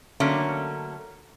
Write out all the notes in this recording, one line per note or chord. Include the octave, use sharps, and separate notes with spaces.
D3 F#3 A3 A#3 C#4